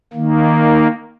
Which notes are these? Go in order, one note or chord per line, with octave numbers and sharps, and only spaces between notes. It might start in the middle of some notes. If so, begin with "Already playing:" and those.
D#3 A#3